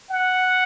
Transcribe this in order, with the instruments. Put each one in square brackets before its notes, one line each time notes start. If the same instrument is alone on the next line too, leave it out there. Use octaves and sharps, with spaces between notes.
[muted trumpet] F#5